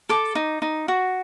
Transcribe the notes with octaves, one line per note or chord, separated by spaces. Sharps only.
A4 D6
D#4
D#4
F#4